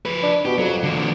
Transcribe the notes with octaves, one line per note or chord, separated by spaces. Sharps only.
F3 B4
D4
B2 G4
F2 F#3
E2 D3